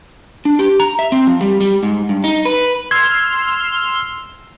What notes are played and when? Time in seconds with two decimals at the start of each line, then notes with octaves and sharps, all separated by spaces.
0.45 D4
0.59 G4
0.80 A#5
0.99 E5
1.12 C4
1.27 F3
1.41 G3
1.61 G3
1.83 G#2
2.09 G2
2.24 D#4
2.45 B4
2.91 C6 E6 F6 G#6